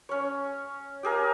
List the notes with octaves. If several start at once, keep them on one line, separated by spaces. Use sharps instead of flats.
C#4 C#5
G4 G#4 A#4 F5